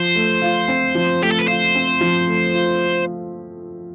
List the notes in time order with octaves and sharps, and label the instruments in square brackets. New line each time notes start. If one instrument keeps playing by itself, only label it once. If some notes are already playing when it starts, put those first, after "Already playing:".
Already playing: [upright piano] F3 [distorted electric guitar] C5
[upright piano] A3
F4
C4
F3
[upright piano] A3 [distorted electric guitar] G4
[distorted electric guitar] A4
B4
[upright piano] F4 [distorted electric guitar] C5
[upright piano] C4
F3
A3
F4